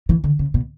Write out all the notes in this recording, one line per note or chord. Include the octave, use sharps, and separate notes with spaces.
E3
D3
C#3
B2